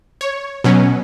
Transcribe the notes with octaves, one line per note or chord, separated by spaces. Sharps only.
C#5
B2 F#3 C#4